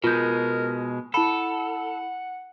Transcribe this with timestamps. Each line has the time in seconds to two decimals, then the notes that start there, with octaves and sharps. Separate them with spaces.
0.04 B2 G#3 F4 A#4 G6
1.14 E4 A4 F#5 A5 B5